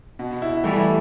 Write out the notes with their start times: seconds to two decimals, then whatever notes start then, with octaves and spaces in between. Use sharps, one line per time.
0.19 B2
0.42 E4
0.64 E3 G3 A3